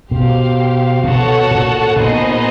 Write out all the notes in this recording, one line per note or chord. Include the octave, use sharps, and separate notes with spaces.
B2 G4 C5 F5
B2 F#4 A4 C#5 F#5 A5
A#2
A#2 B3 D#4 G#4 C5 D#5